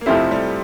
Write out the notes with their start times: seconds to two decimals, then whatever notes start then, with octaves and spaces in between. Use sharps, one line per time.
0.01 A#3
0.06 F2 C3 F3 A3 C4 E4
0.31 G3